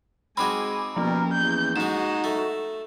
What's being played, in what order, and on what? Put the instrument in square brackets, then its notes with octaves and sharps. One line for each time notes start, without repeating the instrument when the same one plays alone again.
[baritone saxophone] G#3 [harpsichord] C4 D#4 F#4 [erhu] G#5 [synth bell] B5 D6
[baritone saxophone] B2 [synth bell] F3 A#3 C#4 [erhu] A#4
[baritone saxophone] E2 [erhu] G6
[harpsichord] G#2 G#3 [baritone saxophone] D#4 [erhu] F#4 [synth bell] E7
[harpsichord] A3